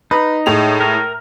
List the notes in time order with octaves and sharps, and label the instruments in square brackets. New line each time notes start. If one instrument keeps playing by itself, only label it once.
[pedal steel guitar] D#4 [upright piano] B4
[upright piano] A2 G#3 F7
[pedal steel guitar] A#4